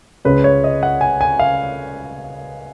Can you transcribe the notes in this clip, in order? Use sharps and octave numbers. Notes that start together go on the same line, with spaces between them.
C#2 C#3 G#3 C#4 B4
C#5
D#5
F#5
G#5
G#5
F5